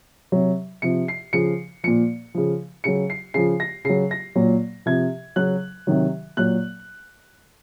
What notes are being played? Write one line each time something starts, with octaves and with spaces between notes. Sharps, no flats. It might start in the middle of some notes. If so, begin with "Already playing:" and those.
C3 F#3
C3 F3 C#7
C7
C#3 F3 C#7
A#2 F3 C#7
C#3 F3
C#3 F#3 C#7
C7
C#3 F3 C7
A#6
C#3 F#3 C7
A#6
A#2 F#3
C3 F3 G#6
C#3 F#3 F#6
C3 D#3 F#3
A#2 F#3 F#6